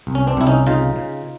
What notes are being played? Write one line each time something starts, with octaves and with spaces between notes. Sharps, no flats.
C2
C#4
C4 D4
C2 E4
C#4 D#4
C#3 D#4 F4
C#3